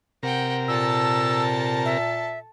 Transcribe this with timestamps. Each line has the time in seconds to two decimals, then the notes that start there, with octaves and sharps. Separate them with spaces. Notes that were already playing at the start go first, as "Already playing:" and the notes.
0.23 C3 A#4 F#5 G5
0.68 A#2 A4 A5 E6
1.85 E5